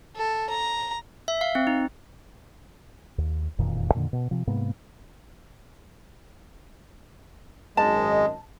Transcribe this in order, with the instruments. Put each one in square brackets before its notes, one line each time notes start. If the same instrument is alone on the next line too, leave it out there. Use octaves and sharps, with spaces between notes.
[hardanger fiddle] A4
A#5
[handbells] E5
F5
C4
D#4
[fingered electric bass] D#2
E1 F2 A#2 D#3
F2 A#2 D3 D#3
B2
C3 F3
G#2 C3 A#3 B3
[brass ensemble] G#1 F#2 D#5 [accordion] G#3 [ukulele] A5